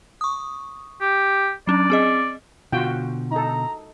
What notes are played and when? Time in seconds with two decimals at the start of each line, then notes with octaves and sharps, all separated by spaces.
0.21 C#6 D#6
1.01 G4
1.67 F#3 C#4 D4 D5
1.90 C4 G#4 D#5
2.72 B2 D3 F4 F#4 G5
3.32 D#4 A4 A#5